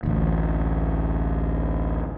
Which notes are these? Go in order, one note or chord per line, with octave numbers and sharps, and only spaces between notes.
A1 D2